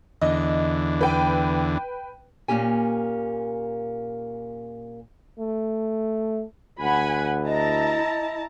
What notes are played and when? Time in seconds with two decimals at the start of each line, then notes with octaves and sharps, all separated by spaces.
0.21 E2 D3 D#5
1.01 B4 G5
2.48 A#2 A#3 C#4 G4 G#5
5.39 A3
6.80 D2 F#5 G#5 B5
7.46 E4 D#5 A5 A#5